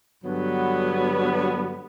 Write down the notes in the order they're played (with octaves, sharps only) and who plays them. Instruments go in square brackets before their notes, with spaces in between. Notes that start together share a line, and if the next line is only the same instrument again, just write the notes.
[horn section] G2 D3 F#3 B3